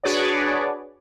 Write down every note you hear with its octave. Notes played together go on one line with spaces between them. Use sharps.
D4 F#4 G#4 B4 C#5 D5